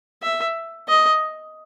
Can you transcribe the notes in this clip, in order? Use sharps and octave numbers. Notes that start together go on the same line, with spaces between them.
E5
D#5